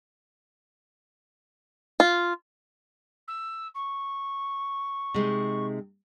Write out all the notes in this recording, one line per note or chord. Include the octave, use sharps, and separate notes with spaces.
F4
E6
C#6
C3 G#3 D#4